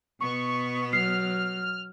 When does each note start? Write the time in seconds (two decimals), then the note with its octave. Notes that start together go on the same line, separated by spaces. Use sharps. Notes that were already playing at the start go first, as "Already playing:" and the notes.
0.21 B2 B3 C#6
0.93 F#3 F6 C7